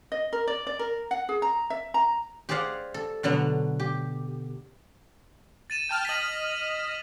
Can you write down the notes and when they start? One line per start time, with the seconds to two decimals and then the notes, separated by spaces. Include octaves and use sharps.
0.12 D#5
0.33 A#4
0.48 D5
0.67 D5
0.79 A#4
1.11 F#5
1.29 G#4
1.42 A#5
1.70 E5
1.94 A#5
2.49 G4 G#4 C5 D5 F5 F#5
2.94 A4
3.23 B2 D3 F#3 B3
3.80 G4
5.70 A6 D#7 E7
5.89 G5 A5 F6
6.05 D#5 F6 B6 D#7 F#7